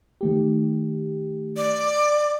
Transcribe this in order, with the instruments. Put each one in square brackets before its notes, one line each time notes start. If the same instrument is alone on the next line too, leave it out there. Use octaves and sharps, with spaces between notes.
[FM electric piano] D#3 A3 G4
[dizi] D5